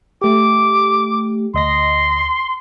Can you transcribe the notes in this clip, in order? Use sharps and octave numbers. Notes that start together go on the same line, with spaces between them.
A3 G4 D6
D2 D#5 C6 A#6